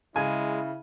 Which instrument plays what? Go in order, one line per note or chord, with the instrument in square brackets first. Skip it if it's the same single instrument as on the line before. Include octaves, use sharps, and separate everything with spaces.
[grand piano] C#3 [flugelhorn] G#3 [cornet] E4 [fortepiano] G#5